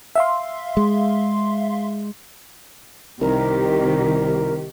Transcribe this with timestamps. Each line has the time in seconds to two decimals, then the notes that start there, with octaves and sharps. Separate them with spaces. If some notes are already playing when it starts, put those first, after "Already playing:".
0.16 E5 F5 C6
0.77 G#3
3.21 C2 C3 D#3 G4 A#4